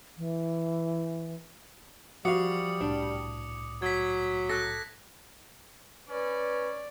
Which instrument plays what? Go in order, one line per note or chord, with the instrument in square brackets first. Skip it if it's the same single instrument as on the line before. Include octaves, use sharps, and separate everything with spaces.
[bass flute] E3
[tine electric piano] F3 [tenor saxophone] G3 [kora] F#4 F5 [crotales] D6 D#6 C#7
[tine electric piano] C2 A2 [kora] D4
[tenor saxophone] F#3 [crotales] G#6 B6
[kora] A4 [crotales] F#6 A#6
[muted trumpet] C#4 [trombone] B4 [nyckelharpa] D5